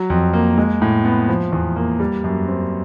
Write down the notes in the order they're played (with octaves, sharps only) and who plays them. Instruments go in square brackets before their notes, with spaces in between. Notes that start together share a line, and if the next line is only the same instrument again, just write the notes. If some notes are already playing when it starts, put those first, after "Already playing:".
Already playing: [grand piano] F#3
F2
A#3
G#3
A2
B3
F3
E2
A#3
G3
F#2
C4